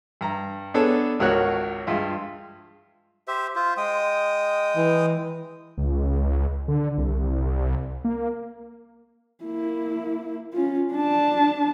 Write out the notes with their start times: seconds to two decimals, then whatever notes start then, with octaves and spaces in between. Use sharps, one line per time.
0.21 G2 A#5
0.74 B3 D4 G#4 A4 C#5
1.20 G#1 C#2 F#4 A#4 C#5 F#6
1.87 G2 G#3 F4 E5
3.28 G4 C5 E5
3.56 F4 C5
3.77 G#3 G5 D#6
4.77 E3
5.78 C#2
6.68 D3
6.98 C2
8.04 A#3
9.44 A#3 E4
10.53 C#4 F4
10.92 D4 A5